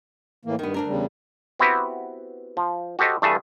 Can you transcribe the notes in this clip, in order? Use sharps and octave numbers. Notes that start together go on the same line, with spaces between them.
A2 E3 A#3
G2 D#3 B3
D2 D4 A#4
E2 C#3 G3
B3 C4 E4 F#4 G4 B4
F3
F#4 G4 A4 C5 D#5
G2 E3 A3 G#4 G#5 A5